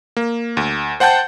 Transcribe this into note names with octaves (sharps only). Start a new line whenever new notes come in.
A#3
D2
C5 F#5 G5 A5 G6